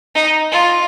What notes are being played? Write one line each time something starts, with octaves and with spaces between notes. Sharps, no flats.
D#4
F4